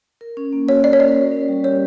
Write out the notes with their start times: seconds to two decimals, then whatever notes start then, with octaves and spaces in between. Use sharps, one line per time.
0.21 A#4
0.37 C#4
0.53 A#3
0.68 F#4 C#5
0.84 A#4 D5
0.93 C#5
1.00 C#4 D5
1.16 A#4
1.32 C#4
1.49 G3
1.64 G4 C#5